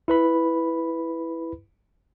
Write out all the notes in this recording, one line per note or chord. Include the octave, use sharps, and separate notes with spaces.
E4 B4 B5